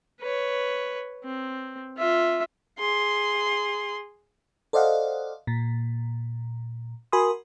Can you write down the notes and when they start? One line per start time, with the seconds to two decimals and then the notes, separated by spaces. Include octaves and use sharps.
0.21 B4 C#5
1.25 C4
1.97 F4 E5
2.79 G#4 C6
4.73 A4 C5 D5 D#5 F5 F#5
5.47 A#2
7.12 F#4 A#4 G#5 B5 C6 D#6